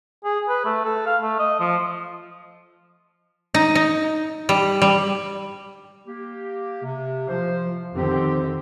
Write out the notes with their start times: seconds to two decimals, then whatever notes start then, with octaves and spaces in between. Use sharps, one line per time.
0.24 G#4
0.48 B4
0.65 A3
0.85 A4
1.06 F5
1.22 A3
1.39 D#5
1.60 F3
3.54 D#4
3.75 D#4
4.49 G3
4.82 G3
6.07 A#3 G4
6.83 C3
7.28 F3 C5
7.96 F2 D3 D#3 C4 G4